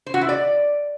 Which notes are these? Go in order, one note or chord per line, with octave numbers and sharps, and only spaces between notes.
C5
F#4
E4
D5